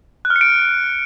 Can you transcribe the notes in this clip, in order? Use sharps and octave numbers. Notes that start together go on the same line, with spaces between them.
F#6
F6
C#7
D7